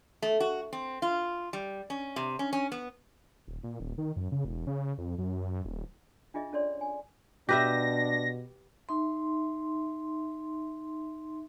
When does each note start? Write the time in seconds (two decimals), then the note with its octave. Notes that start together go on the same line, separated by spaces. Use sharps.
0.22 A3
0.40 F#4
0.73 C4
1.02 F4
1.53 G3
1.90 C#4
2.16 C3
2.39 C#4
2.53 C#4
2.72 B3
3.48 D#1
3.64 A#2
3.80 D#1
3.98 D#3
4.16 F#2
4.32 C#3
4.45 E1
4.67 C#3
4.98 F2
5.18 F#2
5.65 D#1
6.34 D4 F4 G#4 D#5 E5
6.53 C#4 A4 C#5 D5 C6
6.81 G#5
7.49 B2 D4 G4 B4 E5 A#6
8.89 D#4 E5 C6